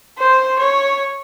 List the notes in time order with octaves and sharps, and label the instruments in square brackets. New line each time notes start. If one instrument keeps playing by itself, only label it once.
[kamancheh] C5
C#5